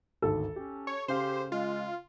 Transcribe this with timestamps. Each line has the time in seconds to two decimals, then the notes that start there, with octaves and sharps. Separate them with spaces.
0.22 G#1 D2 D#3 A4
0.56 C#4 G4
0.87 C#5
1.08 C#3 G4 C5 F5
1.52 G#3 F4